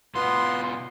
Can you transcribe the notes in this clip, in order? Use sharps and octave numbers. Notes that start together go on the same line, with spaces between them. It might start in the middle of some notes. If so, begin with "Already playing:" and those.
B2 B3 F4 C6